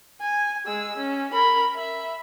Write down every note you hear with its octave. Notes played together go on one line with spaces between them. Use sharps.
G#5
G#3 E6
C#4
A#4 B5
E5